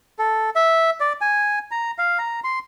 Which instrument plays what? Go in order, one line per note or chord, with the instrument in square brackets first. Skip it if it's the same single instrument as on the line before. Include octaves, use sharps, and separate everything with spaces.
[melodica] A4
E5
D5
G#5
A#5
F5
A#5
C6